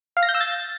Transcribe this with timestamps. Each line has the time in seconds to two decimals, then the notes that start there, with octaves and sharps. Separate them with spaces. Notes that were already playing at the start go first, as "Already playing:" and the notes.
0.17 F5
0.23 A#6
0.29 G6
0.35 E6
0.41 A6